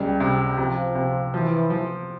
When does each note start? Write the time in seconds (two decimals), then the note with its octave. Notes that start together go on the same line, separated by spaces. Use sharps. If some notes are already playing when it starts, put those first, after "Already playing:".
Already playing: C#2 C#3 G3
0.20 C3
0.58 C3 F3
0.95 C3
1.34 E3 F3
1.70 F3